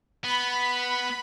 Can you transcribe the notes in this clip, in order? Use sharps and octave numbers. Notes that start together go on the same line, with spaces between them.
B3 B5